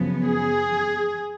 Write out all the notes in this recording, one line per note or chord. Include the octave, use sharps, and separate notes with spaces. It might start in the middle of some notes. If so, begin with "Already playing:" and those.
Already playing: F#2 C#3 F3 B3
G#4